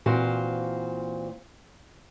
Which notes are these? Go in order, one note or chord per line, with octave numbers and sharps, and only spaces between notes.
A#2 E3 C4 F#4 C5 F5